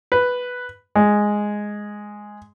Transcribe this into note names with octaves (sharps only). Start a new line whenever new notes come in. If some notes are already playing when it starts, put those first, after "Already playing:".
B4
G#3